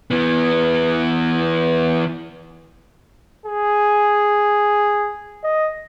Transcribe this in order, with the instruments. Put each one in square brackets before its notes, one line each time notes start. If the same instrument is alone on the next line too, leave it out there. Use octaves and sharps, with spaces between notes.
[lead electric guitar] E3 B3
[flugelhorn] G#4
D#5